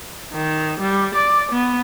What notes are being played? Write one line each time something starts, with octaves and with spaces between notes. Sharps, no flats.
D#3
G3
D5
B3